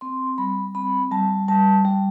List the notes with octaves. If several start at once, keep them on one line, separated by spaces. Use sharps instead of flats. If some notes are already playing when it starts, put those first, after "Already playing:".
C4 C6
G3 B5
C4 B5
G3 A5
G3 A5
G3